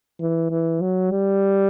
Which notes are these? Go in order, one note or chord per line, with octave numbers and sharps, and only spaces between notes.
E3
E3
F#3
G3